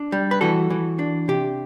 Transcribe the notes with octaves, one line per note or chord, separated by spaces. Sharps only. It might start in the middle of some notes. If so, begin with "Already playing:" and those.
Already playing: D4
G3
B4
E3 F#4 A4
E3
D4
C3 G4